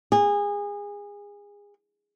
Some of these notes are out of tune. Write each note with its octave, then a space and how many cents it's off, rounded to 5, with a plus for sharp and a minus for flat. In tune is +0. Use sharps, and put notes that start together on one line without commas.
G#4 -25